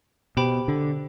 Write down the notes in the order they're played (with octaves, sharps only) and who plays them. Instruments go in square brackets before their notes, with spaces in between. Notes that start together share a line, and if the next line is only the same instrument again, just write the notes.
[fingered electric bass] B2 [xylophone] G4 C5 G5 B5
[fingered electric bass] D3